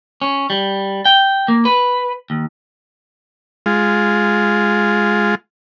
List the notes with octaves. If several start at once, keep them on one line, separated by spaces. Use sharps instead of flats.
C#4
G3
G5
A#3
B4
D#2
G#3 F4